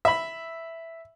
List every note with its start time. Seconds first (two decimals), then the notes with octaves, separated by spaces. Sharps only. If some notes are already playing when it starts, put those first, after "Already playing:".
0.05 E5 B5